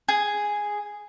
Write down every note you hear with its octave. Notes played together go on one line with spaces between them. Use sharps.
G#4